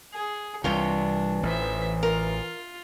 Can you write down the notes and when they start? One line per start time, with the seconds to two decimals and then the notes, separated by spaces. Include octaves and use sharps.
0.14 G#4
0.64 C2 C3 E3 D4 F4 C#5 G5
1.43 A1 C5 E5
2.03 F4 A#4